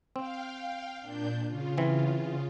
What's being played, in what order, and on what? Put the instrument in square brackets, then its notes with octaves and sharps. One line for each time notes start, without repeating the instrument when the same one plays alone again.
[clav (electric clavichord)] C4 [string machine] F5 G5
[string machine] A#2 D4 G6
C#3 F4
[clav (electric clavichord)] E3 C4